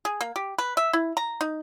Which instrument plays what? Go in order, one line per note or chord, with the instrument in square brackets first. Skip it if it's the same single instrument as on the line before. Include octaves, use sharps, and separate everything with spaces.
[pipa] G#4
A#3
G4
B4
E5
E4
A#5
D#4